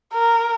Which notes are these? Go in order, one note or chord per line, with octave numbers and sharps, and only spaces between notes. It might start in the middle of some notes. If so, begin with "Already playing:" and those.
A#4